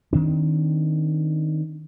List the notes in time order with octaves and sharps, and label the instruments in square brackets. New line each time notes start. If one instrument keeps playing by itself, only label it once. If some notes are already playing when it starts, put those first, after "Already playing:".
[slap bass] D#3 C4 D4